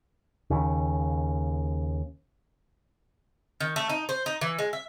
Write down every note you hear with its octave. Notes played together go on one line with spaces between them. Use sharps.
D#2 C#3
D#3
A3
D#4
C5
D#4
E3
G#3
E5